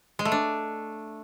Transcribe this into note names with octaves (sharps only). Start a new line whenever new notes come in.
G#3
A3
D4